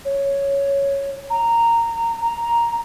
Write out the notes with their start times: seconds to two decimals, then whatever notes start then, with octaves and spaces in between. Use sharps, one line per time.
0.05 C#5
1.30 A#5
2.21 A#5